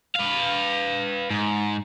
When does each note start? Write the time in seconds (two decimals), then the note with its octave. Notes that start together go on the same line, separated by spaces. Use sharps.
0.16 B4 F5
1.30 G#2